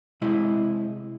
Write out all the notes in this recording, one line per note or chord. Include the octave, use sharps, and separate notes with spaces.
C3 G#3 E4 D#5